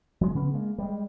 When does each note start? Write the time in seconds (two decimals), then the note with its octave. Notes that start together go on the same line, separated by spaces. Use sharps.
0.21 F#3 G#3
0.35 C#3 F3 B3 C#4
0.54 G#3 A#3
0.78 G3 G#3